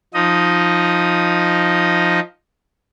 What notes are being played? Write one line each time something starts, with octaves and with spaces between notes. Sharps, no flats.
F3 D#4 D#5